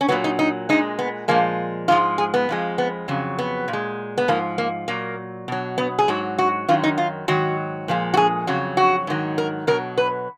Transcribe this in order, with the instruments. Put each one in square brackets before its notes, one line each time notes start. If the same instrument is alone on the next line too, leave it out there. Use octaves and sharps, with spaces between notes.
[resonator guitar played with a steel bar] C#4
A#2 F#3 B3
D#4
D#4
A#2 G#3 D#4
B3
A#2 F3 G#3 A#3
G#2 F3 G#3 F4
G#4
B3
F2 F3 G#3
B3
F2 C#3 F#3
B3
A#2
G#3
B3
G#2 F3 A#3
A#3
A#2 F#3 A#3
B2 F#3
B3
G#4
G#2 F#3 F#4
F#4
F#2 D#3 F#3 F4
D#4
F4
G#2 D#3 F#3 F#4
A#2 F3 G#3
F#4
G#4
F2 C#3 F#3 F#4
F#4
G#2 D#3 F#3
A#4
B2 F#3 A#4
B4